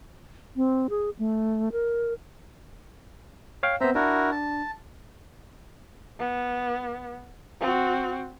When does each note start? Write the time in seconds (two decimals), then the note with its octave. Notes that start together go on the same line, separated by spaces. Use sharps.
0.56 C4
0.90 G#4
1.19 A3
1.72 A#4
3.63 C#5 F5 G5
3.81 B3 C4 C5 E5 A#5
3.95 D4 E4 F#4 A#4
4.32 A5
6.19 B3
7.61 C4 F#4